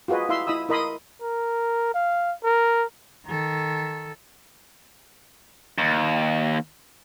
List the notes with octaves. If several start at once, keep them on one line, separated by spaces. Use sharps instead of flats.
F4 F#4 G#4 B4 D#5
E4 E5 F5 C6 E6
E4 D#5 B5 D#6 E6
E4 A#4 D#5 B5 C6 D#6
A#4
F5
A#4
D#3 A4
D#2